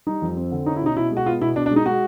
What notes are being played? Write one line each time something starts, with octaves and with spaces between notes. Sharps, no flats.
G3 D#4
F2
C4
D3
C#4 D#4
E4
B2 D#4
B2 E4
G#3
F#4
B3 F4
B2 E4
B2 D4
D4
G#3 D#4
G#3 F#4